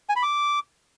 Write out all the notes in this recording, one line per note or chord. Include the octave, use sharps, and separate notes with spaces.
G#5
B5
D6